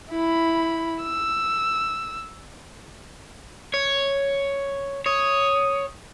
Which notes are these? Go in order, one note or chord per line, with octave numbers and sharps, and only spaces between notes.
E4 B5
E6
C#5
C#5 D#6